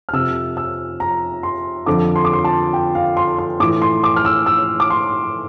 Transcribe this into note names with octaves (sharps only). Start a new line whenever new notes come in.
F6
F2 C3 F3 E6
E6
A#5
C6
F2 D3 F3 D6
C6
D6
C6
A5
G5
F5
C6
C6
A2 E3 D6
C6
D6
F6
E6
E6
D6
C6